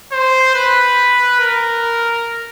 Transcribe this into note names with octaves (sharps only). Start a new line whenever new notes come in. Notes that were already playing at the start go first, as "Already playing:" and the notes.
C5
B4
A#4